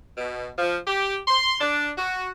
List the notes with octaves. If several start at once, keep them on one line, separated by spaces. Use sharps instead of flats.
B2
F3
G4
C6
D4
F#4